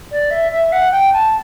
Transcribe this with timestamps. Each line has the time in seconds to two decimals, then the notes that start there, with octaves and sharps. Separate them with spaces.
0.12 D5
0.31 E5
0.52 E5
0.72 F#5
0.92 G5
1.13 A5